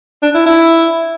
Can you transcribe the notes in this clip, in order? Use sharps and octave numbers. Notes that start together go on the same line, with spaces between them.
D4
E4
E4